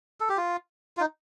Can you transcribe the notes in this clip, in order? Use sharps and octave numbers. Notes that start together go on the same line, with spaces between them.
A4
G4
F4
F4
D#4